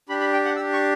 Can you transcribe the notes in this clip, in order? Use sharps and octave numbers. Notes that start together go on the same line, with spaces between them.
D4 G4 B5
B5
G5
F#5
D4 G4 E6
C#6